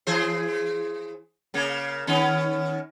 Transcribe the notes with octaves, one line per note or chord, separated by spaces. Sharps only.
E3 G#4 C5
C#3 A#3
D#3 B3 C#4